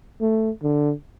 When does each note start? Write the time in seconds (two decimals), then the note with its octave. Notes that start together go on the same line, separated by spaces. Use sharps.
0.21 A3
0.63 D3